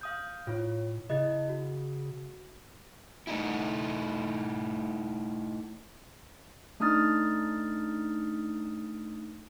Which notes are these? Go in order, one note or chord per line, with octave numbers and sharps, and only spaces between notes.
F5 D#6 G6
A2 F4 C#5
C#3 E4 D#5
F#4
A3 D#4 E4
A3 D4 D#4 D#6 F6 A6